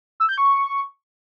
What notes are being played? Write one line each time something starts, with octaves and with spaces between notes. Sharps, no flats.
E6
G6
C#6